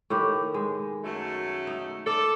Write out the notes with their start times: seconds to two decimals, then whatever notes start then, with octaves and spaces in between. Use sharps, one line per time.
0.10 A2 D#3 G4
0.54 G#3
1.04 F#2 A3
1.67 D#4
2.06 A4 D5